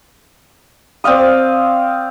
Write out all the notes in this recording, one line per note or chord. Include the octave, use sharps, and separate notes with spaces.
C4 D5 F5 D#6